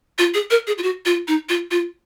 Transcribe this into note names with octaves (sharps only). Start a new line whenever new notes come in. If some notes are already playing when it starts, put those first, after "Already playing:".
F4
G#4
A#4
G#4
F4
F#4
F4
D#4
F4
F4